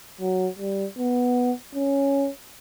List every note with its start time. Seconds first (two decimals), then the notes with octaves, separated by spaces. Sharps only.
0.20 F#3
0.58 G3
0.98 B3
1.75 C#4